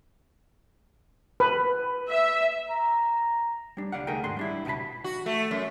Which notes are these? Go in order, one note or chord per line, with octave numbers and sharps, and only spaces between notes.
B4
E5
A#5
G3 D4
C#2 D5 F5 F#5
C#2 D#3 A3 G#4 A#4 G5
D#2 G#2 D4 C6
G3 D4 E4
C#2 B2 G5 A5 B5
F#4
A3
F#2